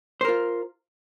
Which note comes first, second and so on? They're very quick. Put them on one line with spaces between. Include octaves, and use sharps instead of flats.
C5 A#4 F4